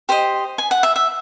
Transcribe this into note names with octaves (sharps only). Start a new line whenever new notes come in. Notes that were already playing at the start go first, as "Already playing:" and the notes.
G4 C5 D#5
G#5
F#5
E5
E5